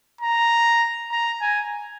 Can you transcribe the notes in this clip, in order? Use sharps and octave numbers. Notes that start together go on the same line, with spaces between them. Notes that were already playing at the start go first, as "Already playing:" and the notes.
A#5
A#5
G#5